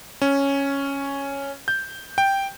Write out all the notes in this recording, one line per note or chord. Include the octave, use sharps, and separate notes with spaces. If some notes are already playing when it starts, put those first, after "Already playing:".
C#4
G6
G5